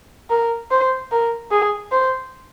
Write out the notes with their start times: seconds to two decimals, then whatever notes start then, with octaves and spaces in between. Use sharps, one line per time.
0.30 A#4
0.71 C5
1.12 A#4
1.52 G#4
1.92 C5